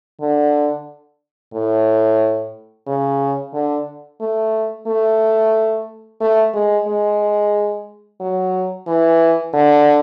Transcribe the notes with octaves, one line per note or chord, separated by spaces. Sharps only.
D3
A2
C#3
D3
A3
A3
A3
G#3
G#3
F#3
E3
D3